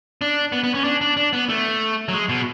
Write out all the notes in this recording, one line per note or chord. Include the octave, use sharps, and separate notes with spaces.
D4
B3
B3
C#4
D4
D4
D4
B3
A3
F#3
G#3
B2